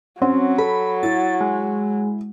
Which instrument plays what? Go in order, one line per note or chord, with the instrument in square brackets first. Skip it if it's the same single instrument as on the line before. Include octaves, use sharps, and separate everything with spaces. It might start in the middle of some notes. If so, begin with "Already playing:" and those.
[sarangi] F#3 [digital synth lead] C4 [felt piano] C#4 F#5
[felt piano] A4 [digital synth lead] B5
[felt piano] E4 [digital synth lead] A6
[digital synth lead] G#3